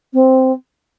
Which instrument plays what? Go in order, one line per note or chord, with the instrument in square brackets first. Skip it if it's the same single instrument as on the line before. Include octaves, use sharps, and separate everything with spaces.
[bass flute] C4